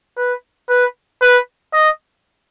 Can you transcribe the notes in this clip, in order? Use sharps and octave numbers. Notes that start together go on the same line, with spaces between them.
B4
B4
B4
D#5